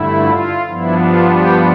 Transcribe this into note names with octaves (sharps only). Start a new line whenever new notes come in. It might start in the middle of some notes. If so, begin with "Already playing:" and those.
Already playing: G2 D3 A3 E4
F4
G2 F3 B3 D4 E4
F4
G4